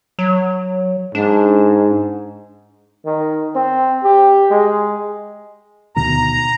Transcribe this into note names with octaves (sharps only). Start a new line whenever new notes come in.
F#3
G#2 D4
D#3
C4
G4
G#3
D2 B2 D#3 A#5